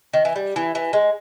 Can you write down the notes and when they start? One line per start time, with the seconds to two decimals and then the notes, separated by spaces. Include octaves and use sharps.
0.13 D#3
0.25 E3
0.36 G3
0.56 E3
0.75 E3
0.93 G#3